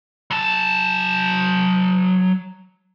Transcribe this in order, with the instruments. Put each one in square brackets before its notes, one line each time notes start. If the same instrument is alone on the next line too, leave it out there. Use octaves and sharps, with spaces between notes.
[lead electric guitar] F#3 A5